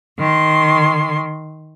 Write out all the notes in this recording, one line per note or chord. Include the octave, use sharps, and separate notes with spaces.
D#3 C6